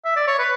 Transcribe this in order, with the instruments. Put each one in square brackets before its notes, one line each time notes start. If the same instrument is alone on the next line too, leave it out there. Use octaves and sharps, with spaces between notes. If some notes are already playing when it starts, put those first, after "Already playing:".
[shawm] E5
D5
C#5
B4